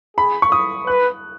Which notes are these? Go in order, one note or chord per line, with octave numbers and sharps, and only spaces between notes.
G#4 B5
C#6
D#6
B4 F#6